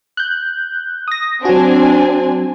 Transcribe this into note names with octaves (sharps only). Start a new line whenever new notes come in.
F#6 G6
D#6 A#6
F#3 C4 D4 F#4 G#5